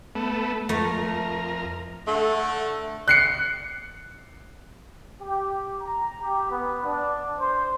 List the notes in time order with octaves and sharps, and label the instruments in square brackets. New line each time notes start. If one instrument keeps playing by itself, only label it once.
[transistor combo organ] A3 B3
[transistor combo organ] F2 A#4 [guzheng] A3
[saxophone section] D3 A3
[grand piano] F#6 C7 C#7
[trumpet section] G4
A#5
G4
B3
D4
C5